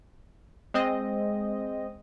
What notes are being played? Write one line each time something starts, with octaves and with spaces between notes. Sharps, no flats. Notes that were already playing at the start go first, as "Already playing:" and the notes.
G#3 C4 D#5